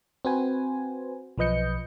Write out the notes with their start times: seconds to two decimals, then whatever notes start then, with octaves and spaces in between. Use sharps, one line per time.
0.25 C4 F#4 B4 C5 G#5
1.38 B1 F3 B4 D#5 G6 C#7